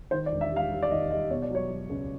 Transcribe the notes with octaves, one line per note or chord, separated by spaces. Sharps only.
D#3 C5
D5
E1
E5
G3
F5
G3
D5
D#2 D#5
G3 D#5
B2 C#5
D5
F#3 C#5
F#3
C#2